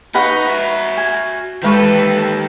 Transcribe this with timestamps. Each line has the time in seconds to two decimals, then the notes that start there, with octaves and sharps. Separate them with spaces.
0.15 D#4 B4 D#5 F#5 C#6
0.47 F#4 E5
0.97 G#5
1.63 D#3 E3 G#3 G4 A4 B4 C#6